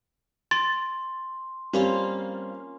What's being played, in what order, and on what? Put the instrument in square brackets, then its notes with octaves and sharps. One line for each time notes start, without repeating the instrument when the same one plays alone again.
[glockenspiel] C6 [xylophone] A6
[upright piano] G3 C4 [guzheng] A#3 C#4 F4